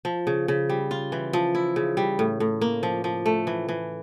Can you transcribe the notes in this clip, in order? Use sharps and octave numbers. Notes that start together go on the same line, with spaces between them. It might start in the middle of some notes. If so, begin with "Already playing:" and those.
F3
C#3
C#3
G3
F4
E3
F3
E4
C#3
G3
A2
A2
A#3
F3
F3
A3
E3
E3